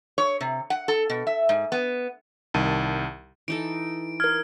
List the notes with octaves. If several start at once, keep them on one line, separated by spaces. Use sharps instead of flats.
C#5
C3
F#5
A4
B2
E5
G#2
B3
C2 D#3 A5 D#7
E3 D#4 A4 D7
A#4 F6 G#6